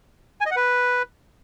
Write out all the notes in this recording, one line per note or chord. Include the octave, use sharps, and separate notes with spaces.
G#5
D#5
F#5
B4